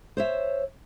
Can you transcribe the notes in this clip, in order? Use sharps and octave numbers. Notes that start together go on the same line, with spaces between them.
C5 C#5 E5